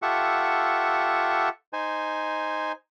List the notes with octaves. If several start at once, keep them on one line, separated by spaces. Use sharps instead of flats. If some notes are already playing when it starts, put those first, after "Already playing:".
F4 G4 A4 E5 F#5 C#6
D#4 C5 G#5